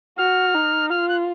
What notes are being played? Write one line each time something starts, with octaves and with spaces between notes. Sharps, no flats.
F#4 F6
D#4
F4 F6
F#6